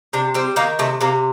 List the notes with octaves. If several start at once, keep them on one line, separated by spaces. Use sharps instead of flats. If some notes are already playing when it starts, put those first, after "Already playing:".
C3 D4
G3 C4
D#3 A#3
C3 A3
C3 A#3